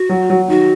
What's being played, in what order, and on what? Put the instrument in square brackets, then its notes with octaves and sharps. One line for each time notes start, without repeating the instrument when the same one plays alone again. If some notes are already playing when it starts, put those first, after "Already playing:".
Already playing: [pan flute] F#4
[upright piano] F#3
F#3
[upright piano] D#3 [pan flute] F#4